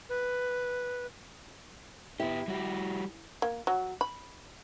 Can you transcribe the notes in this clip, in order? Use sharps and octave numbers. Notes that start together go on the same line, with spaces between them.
B4
B3 E4 G4
G3 F#4 G4
A#3
F#3
B5